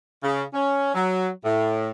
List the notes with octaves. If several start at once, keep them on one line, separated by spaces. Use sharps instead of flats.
C#3
C#4
F#3
A2